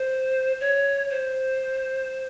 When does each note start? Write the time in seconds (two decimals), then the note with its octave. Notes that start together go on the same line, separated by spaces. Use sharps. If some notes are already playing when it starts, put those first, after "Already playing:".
Already playing: C5
0.60 C#5
1.10 C5